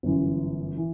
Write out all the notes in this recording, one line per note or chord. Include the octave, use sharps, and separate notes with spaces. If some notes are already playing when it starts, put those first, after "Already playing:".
G1 F#2 E3
E3